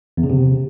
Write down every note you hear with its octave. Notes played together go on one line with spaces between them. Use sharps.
E2
C#3
C3